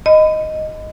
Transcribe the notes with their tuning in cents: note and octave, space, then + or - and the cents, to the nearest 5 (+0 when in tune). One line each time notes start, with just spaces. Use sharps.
D#5 +0 B5 +30